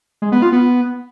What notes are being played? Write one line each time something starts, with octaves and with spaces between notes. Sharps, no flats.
G#3
B3
F4
B3